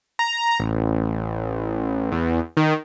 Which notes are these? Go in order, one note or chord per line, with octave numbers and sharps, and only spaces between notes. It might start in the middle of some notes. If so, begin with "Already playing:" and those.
A#5
A1
E2
D#3